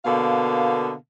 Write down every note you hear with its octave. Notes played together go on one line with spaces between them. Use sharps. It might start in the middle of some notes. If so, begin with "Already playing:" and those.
B2 D3 A#3 F5